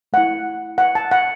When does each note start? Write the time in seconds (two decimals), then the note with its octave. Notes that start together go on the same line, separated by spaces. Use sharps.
0.13 A3 E4 F#5
0.78 F#5
0.95 A5
1.11 F#5